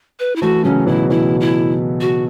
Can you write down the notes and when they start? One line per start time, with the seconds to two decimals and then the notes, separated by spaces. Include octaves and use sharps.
0.19 B4
0.36 E4
0.42 E3 A3 F#4
0.64 C#3 F#3 C#4
0.87 B2 E3 E4
1.10 B2 E3 E4
1.40 E4
2.01 F#4